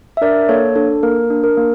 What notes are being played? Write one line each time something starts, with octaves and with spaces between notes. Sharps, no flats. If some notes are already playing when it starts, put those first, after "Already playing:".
E5
D4 A#4 D5
A#3 A4 C#5
D4 A4
A#3 A#4
D4
A#4
A#3